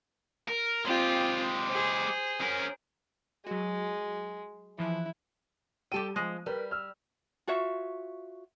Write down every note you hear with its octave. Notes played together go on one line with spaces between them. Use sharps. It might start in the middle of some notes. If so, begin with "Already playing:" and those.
A#4
G#3 C4 F4 G4
G#4 C5
C#4 A#4
F#3 G#3 F#4
E3 F3 E4 F#6
G3 G4 A4 G5 D#7
F3 G#3
G3 A#4 B4
E6 F6
F4 F#4 C#5 E5